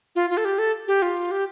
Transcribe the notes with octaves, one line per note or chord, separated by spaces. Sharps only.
F4
F4
A4
G4
A4
G4
F4
G4